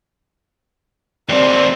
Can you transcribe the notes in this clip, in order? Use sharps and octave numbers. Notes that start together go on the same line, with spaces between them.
D#2 C4 D5